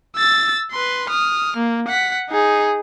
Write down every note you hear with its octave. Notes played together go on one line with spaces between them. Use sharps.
E6 A6
B4 C6
D#6 F6
A#3
F#5 B6
D#4 G#4